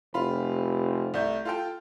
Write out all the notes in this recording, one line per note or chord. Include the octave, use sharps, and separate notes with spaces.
F1 F4 B5
C2 A3 G6
F4 A4 G5